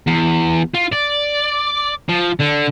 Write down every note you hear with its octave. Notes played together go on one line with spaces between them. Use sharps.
E2
F4
D5
F3
D3